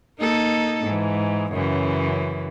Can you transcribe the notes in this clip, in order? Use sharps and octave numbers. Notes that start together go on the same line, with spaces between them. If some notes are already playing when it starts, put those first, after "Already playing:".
A#3 D#4 A4
G#2 E3
F#2 C#3 E3